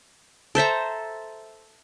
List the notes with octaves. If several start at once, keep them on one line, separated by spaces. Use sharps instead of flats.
A4 C5 E5 A#5